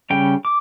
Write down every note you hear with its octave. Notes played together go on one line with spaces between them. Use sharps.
C#3 G3 C#4 G5
D6